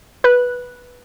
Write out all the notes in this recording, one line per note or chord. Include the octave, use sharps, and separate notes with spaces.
B4 F#6